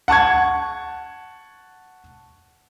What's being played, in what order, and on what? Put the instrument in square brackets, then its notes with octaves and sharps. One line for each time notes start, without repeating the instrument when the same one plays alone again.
[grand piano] F#5 A5 C#6 G#6